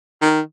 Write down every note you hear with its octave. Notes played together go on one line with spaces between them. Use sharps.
D#3